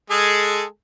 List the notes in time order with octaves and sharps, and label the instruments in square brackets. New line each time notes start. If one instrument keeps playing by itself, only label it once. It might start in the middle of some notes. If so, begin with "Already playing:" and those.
[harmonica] G#3 G#4 A4